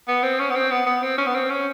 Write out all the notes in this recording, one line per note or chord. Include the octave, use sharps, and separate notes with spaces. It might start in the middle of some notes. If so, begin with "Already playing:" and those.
B3
C4
C#4
B3
C4
B3
B3
C4
C#4
B3
C4
C#4